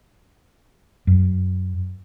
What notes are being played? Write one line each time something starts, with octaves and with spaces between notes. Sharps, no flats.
F#2